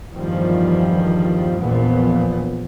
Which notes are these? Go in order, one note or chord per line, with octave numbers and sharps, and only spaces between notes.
E2 G2 D#3 F3 G3
A#1 E2 A#2 F3 B3